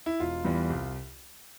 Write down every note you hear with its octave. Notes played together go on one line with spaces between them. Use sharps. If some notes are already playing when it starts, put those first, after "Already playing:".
E4
E1 F4
E2 E3 G3
C2